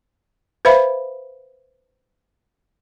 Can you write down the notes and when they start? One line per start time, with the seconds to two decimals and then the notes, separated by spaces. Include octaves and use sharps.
0.65 B4 C5 E5 F5 B5